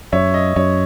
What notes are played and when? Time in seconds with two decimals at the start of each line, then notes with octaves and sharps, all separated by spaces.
0.12 F#2 C#5 E5
0.34 D#5
0.56 F#2 C#5